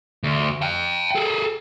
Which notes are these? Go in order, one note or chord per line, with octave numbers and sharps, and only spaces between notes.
D2
F5 G5
G#4 A4